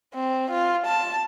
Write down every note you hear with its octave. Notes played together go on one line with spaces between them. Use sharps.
C4
F4
A5